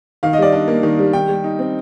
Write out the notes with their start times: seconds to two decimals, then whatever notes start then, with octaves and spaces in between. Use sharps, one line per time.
0.23 D#3 F5
0.33 D#5
0.38 G3 D5
0.52 D4 D#5
0.68 A#3
0.83 D#3
0.99 G3
1.13 D#3 G5
1.28 G3
1.44 D#4
1.59 C4